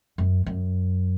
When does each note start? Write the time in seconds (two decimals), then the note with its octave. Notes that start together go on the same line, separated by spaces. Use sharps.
0.18 F#2
0.46 F#2